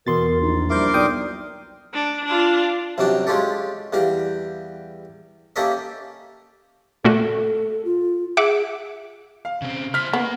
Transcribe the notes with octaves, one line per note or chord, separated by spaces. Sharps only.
E2 B2 A#4 C6 A6
A#1 D#4
G3 E4 A#4 C5 C6 D6
B1 D5 G5 D#6
D4
D4 F4
C2 F#2 F#3 G3 D4 G5
G#3 C#4 F4 G4 A4
E2 G3 G4 F5
A#3 C#4 G4 A4 D#5 E5
A#2 A3 F#4 A4
F4
G#4 E5 F#5 D6
F5
C#3 C4
E4 C5 F6 B6
A#3 B3